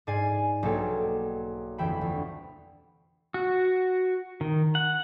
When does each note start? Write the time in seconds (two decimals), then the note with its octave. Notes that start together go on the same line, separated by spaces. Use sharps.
0.07 G#2 D5 G#5 C7
0.63 B1 A#3 D#4 A4 C#5 G5
1.78 G1 F2 E3 E5 G5 B5
2.01 D2
3.34 F#4
4.41 D#3
4.75 F#5